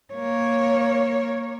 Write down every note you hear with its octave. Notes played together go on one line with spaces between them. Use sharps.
A#3 C#5